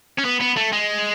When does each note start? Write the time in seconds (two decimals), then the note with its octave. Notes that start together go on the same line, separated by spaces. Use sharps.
0.18 C#4
0.24 B3
0.40 B3
0.56 A3
0.72 G#3